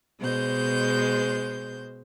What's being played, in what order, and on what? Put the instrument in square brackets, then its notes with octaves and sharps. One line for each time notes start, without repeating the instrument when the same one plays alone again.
[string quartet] B2 G#3 C5 G6